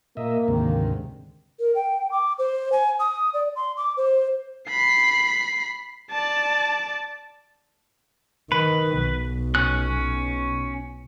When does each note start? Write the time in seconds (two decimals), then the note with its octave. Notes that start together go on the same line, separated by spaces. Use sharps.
0.17 A#2 A#3 D#5 E5
0.48 D2 G#2 C3 D#3
1.60 A#4
1.75 G5
2.11 D6
2.39 C5
2.72 G#5
3.00 D#6
3.34 D5
3.56 C6
3.77 D6
3.97 C5
4.69 B5 C7
6.11 D5 A5
8.52 D#3 B4
9.02 B1 B2
9.55 C#4 F#6